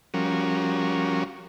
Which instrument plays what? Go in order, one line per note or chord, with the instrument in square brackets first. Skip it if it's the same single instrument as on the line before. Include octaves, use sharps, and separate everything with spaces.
[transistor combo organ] F3 G3 C#4 F#4 A#4